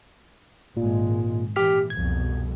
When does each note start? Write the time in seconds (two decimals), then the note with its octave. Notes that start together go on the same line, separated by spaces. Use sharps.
0.77 G#1 A#2 G#3
1.56 A#2 E3 G4 F6 B6
1.90 C2 F2 B2 G#6